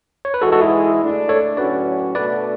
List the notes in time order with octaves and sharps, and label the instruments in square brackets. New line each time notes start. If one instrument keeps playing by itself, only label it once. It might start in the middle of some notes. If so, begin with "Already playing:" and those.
[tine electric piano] C#5
B4
[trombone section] G#2 E3 G#3 [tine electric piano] F#4 A4
[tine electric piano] F#4 A4
E4 G#4
[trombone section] D3 A3 D4
[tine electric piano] A4 C#5
[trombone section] A2 F#3 C#4 F#4 [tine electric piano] B4 D5
[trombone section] B2 A3 D4 F#4 A4 [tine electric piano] B4 D5